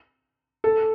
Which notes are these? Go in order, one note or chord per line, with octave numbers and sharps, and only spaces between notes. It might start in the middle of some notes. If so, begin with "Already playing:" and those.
A4